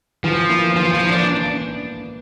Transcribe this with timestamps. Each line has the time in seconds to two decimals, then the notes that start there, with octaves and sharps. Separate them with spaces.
0.24 E3 F3
0.49 A#3 E4
0.76 E3 F3
0.93 F3
1.01 A#3 E4
1.10 D4